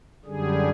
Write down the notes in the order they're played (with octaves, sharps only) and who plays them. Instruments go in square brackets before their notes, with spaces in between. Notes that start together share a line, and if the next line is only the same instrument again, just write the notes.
[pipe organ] F#2 D3 G3 G#4